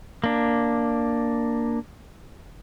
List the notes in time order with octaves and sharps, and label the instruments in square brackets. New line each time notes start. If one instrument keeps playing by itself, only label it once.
[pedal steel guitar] A#3 D4